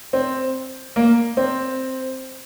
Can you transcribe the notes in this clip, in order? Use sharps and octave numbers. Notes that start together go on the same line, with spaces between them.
C4
A#3
C4